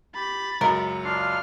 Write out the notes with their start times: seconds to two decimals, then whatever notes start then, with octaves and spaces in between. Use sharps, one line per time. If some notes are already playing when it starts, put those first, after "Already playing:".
0.15 G4 B5 A6
0.61 C#2 F#2 A#4 A#5 C#6
1.05 D4 F4 F5 F6